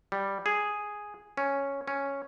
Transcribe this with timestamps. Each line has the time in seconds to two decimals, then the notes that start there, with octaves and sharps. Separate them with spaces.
0.12 G3
0.46 G#4
1.37 C#4
1.88 C#4